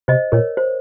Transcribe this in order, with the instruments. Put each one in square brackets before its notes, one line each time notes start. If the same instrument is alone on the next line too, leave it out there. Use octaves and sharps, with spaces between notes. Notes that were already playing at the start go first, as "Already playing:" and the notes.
[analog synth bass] C3 [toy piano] C5 D#5
[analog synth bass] A#2 [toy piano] A#4 C#5
[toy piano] C5